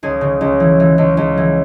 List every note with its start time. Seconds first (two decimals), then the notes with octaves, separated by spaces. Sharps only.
0.03 C#2 G#4
0.21 C#3
0.41 C#2
0.60 E3
0.80 E3
0.98 C#2
1.17 C#2
1.38 E3